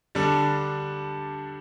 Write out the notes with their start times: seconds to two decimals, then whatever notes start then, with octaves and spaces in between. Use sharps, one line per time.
0.15 D3 G3 D4 A4